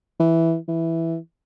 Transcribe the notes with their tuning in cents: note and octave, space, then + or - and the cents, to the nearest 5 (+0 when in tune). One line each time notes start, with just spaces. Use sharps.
E3 -5
E3 +0